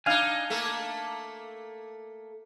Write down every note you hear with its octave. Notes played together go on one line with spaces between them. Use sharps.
D4 D#4 F5 G#5
A3 A#3 A4